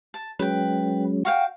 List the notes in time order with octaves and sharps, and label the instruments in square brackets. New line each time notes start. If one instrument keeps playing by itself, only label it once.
[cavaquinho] A5
[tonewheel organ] F#3 G#3 C#4 [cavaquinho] B4 G5
[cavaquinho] F#4 F5 G5